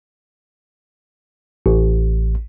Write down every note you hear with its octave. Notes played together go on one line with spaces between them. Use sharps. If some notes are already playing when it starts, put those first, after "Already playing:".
A1